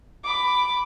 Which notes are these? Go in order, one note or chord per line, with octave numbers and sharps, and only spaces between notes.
B5 D6